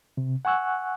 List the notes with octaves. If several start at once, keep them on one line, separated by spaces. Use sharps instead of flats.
C3
F#5 G#5 C#6 E6 F#6